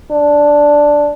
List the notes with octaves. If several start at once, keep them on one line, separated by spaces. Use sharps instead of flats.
D4